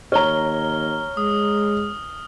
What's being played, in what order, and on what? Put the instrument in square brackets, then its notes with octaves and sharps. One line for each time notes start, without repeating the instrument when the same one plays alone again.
[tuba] D#2 [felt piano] C#5 A#5 [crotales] F6 G7
[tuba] G#3 [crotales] D#6